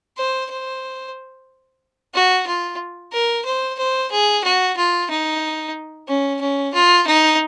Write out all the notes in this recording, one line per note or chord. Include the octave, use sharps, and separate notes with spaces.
C5
C5
F#4
F4
A#4
C5
C5
G#4
F#4
F4
D#4
C#4
C#4
F4
D#4